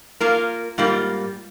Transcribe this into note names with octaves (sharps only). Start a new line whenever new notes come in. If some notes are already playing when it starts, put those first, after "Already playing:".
A#3 F4 A#4
G#2 G3 A#3 F4